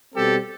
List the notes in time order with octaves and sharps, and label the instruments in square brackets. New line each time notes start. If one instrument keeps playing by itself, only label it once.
[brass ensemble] B2 G3 C4 G4 A4